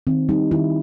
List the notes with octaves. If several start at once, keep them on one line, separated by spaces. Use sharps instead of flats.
D#3 C4
G3 D#4
D#3 E4